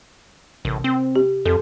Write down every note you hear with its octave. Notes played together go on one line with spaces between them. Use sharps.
A1 C3
C4
G4
F2 A4